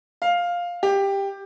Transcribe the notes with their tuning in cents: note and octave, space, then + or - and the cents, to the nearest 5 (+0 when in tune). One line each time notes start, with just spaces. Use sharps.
F5 +5
G4 +10